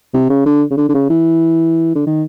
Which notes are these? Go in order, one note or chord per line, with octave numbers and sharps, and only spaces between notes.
C3
C#3
D3
C#3
D3
D3
C#3
E3
D3
D#3